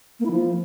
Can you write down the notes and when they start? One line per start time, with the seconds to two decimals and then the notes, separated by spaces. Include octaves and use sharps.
0.20 A#3
0.25 E4
0.31 F3